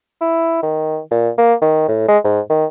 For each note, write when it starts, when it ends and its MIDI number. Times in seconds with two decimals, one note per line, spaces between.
0.21 0.62 64
0.63 0.99 51
1.11 1.30 46
1.38 1.54 58
1.62 1.84 51
1.88 2.04 45
2.08 2.18 56
2.25 2.41 44
2.50 2.66 51